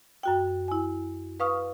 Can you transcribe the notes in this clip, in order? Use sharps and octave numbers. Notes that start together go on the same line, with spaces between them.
F#2 F#4 G5
E4 G#5
B4 F5 C#6 D#6 F6